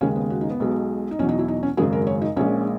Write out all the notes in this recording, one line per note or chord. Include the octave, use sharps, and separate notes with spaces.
D#2 C#3 G#3 C#4
B3
F#4
D#4
B3
B1 B2 G#3
D#4
E2 B2 F#3 C#4
D#4
E4
D#4
C#4
G#1 F#2 C#3 G#3 G#4
A#4
C#5
D#4
A#1 A#2 G#3 C#4